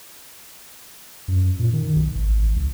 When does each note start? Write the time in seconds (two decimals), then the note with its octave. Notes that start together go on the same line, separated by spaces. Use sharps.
1.28 F#2
1.59 A#2
1.73 D#3
1.96 B1
2.15 G#1
2.35 A1
2.56 C#2